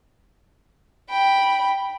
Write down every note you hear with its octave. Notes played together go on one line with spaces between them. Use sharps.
G5 B5